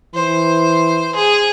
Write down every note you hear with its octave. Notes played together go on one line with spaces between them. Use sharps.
E3 C5
G#4